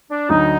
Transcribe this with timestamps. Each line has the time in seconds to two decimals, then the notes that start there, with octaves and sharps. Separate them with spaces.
0.10 D4
0.29 D2 D3 F#3 D#4